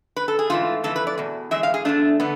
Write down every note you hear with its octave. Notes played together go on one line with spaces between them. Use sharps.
B4
A4
G#4
G#2 E3 A3 F4
F2 E3 A3 A4
B4
D5
E2 B2
A2 E3 G#3 E5
F5
G#4
E2 B2 A3 D4
D3 A3 B3